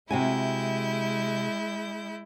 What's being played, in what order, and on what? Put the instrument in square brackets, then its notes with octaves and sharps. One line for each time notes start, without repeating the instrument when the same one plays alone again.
[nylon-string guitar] C3 F#4 G#5 [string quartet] G#3 E4 G6